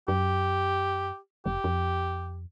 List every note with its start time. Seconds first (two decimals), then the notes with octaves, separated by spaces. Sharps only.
0.08 F#2 G4
1.46 F1 G4
1.64 F2